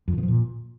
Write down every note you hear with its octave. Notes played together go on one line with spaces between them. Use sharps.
F2
D3
B2
F3
A#2